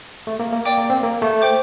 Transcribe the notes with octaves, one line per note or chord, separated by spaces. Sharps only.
A3
A#3
A#3
D5 G5 D6
A#3
C4
A#3
A3
C5 G5 D6 G6